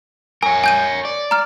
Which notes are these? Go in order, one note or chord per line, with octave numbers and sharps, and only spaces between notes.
A#4 C#5 G#5
G#5 G6 D#7
D5
A#5 F6